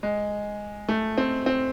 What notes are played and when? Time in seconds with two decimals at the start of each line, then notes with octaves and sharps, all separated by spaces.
0.03 G#3
0.89 A3
1.18 C4
1.46 C4